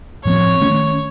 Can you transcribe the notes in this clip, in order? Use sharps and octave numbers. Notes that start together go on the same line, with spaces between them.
A2 F3 C4 C#5
D#3 A3 C#4